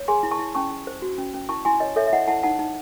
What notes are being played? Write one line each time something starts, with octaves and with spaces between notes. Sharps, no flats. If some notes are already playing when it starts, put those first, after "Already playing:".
Already playing: C#5
G#4 G#5 C6
E4
A5 C#6
E4
C#4 A5 C#6
C#4
C5
F#4
C#4
C#4
E4 A5 C#6
E4 G#5 C6
C#5 D#5
A4 C#5 E5
E5
E4 D#5 F#5
E4 F#5 A5
D#4 F#5 A5
D#4